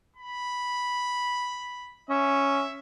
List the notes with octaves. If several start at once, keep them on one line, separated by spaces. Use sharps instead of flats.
B5
C#4 E5